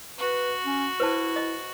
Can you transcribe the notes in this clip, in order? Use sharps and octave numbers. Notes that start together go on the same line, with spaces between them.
F#4 B4
C#4
E4 B4 C5 A5
D#5